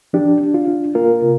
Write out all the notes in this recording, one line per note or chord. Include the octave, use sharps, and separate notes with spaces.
F3 D4 G4
D4
F4
D4
A#3 F4 A#4
C3